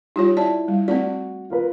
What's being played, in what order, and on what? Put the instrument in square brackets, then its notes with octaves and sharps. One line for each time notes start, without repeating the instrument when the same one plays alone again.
[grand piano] G3 [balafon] D#4 F4 C#5
[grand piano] E4 [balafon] D5 A5
[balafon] G3
[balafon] A3 C4 D5 [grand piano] F#4
[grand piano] F4 A#4 B4